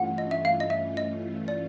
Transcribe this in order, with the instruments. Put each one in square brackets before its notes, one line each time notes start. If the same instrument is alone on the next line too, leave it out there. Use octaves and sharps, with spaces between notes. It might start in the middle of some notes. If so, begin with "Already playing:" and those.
Already playing: [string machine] G2 E3 A3 C#4 F4 [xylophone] F#5
[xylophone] D#5
E5
F5
D#5
E5
D#5
D5